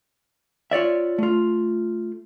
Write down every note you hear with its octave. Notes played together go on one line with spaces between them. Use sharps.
F4 C#5 D5 E5
A3 F4